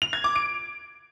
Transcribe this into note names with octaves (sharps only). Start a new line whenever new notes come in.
F7
G#6
D6
D7